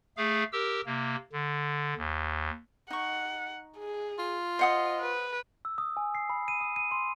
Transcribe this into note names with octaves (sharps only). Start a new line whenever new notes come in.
A3 G#4 F5
G4 A#4 E6
C3 A#3
D3
D#2
D#4 F#5 C#6
G#4
F4
C5 D#5 F#5 D#6
B4
E6
D#6
G#5
C7
B5
D#7
D#6
D#7
C6